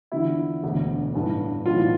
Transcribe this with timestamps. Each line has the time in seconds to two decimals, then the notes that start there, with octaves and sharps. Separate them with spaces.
0.12 E2 D3 F3 E4
0.63 E1 D2 D3
1.14 A1 G2 E3
1.65 B1 A2 E3 F4